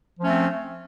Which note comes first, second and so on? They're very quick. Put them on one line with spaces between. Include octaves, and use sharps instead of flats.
F3 C#4 A3 C4